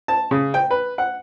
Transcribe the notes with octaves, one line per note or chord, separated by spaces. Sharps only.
A5
C#3
G5
B4
F#5